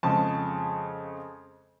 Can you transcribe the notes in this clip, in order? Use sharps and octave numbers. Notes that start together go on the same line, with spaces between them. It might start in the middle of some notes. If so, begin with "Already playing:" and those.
F2 C#3 G#3 A5